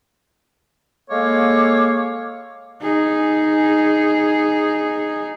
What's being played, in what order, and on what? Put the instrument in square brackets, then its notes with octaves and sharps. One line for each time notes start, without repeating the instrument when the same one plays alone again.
[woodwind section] G#3 A#3 A4 C#5 F5 D6
[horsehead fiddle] D#4 G#4